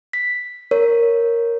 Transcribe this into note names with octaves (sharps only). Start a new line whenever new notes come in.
B6
A#4 C#5